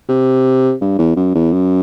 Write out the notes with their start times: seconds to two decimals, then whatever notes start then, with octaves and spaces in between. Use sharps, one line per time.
0.09 C3
0.81 G2
0.99 E2
1.16 F#2
1.35 E2
1.52 F#2